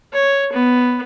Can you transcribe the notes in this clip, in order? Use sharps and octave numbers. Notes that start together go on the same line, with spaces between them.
C#5
B3